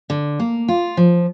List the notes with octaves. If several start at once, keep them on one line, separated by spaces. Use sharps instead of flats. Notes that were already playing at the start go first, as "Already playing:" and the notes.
D3
A#3
F4
F3